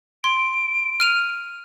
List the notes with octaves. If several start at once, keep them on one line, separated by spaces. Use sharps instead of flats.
C6 D7
F6 D#7 F7